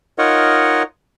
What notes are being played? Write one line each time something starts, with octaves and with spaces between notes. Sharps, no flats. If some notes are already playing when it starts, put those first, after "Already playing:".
D#4 F4 A#4 C#5 D#5 F#5